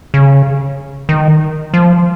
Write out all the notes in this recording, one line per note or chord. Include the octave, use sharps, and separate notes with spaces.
C#3
D#3
F3